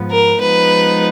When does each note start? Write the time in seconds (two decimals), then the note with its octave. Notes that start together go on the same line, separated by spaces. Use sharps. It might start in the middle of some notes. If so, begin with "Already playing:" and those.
Already playing: G#2 F3 B3
0.11 A#4
0.41 F3 G#3 B3 D#4 B4